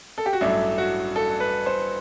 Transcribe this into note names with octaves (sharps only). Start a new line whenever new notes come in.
A4
G4
F#4
A1 G2 F#3 A3 D4 E4
F#4
A4
B4
C5